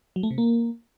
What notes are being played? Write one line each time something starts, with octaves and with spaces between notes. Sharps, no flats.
F#3
A3
C3
A#3